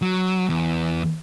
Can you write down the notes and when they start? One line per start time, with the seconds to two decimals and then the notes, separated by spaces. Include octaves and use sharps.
0.02 F#3
0.49 E2